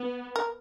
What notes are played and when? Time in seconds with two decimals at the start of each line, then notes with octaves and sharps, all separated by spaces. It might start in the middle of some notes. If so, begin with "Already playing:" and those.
Already playing: B3
0.36 A#4